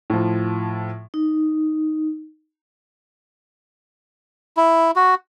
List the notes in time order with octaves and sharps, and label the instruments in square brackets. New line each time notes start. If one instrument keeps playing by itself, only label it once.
[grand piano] A2 F3
[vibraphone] D#4
[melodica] E4
F#4